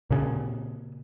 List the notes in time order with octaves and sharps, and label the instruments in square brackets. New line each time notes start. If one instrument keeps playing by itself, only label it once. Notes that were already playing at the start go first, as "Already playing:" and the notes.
[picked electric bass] A#2 C#3